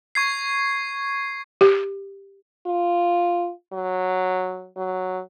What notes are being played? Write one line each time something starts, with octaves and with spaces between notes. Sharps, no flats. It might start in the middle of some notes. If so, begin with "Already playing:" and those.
C#6 G#6 C7
G4
F4
F#3
F#3